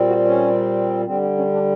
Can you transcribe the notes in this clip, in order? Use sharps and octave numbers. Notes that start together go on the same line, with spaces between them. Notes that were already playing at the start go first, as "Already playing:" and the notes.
Already playing: A#2 G3 C4
F#4
C#4
D3 G3 C4
C4
C#4
D4